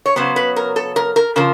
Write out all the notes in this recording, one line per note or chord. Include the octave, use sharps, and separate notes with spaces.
C#5
C#3 F#3 B3 C5
B4
A#4
A4
A#4
A#4
C#3 F3 A#4